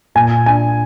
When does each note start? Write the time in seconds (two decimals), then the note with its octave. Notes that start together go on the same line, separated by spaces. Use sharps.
0.15 A#2 G#5
0.46 D4 G#5